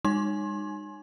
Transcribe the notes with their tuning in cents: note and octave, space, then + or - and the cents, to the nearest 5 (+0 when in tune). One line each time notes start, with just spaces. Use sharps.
G#3 -40 D#4 -25 C6 +35